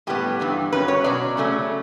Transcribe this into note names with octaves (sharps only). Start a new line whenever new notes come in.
A2 G3 B3 G4
G2 E3 B3
G2 F#3 C#4 B4
C#5
B2 F#3 C#4 D5
C#3 F#3 A3 C#4